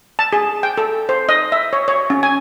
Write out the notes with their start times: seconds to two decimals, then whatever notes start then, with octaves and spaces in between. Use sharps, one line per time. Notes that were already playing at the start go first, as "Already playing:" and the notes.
0.19 A5
0.33 G#4
0.63 G5
0.78 A4
1.09 C5
1.29 D#5
1.52 E5
1.73 C#5
1.88 C#5
2.10 C#4
2.23 G#5